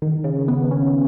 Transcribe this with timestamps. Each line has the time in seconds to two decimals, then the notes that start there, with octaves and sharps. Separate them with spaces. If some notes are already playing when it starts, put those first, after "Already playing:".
0.02 D#3
0.24 C#3
0.48 B3
0.71 C#4